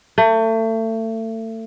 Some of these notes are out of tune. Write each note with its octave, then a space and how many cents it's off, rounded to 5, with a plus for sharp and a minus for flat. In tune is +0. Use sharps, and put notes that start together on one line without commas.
A3 +30